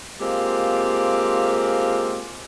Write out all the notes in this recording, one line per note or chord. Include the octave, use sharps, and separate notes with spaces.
G#3 A#3 C4 F4 G4